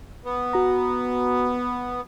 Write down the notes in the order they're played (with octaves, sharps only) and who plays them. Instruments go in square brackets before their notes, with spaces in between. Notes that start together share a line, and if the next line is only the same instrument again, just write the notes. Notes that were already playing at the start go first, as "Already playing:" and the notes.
[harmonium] B3
[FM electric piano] F#4 A#5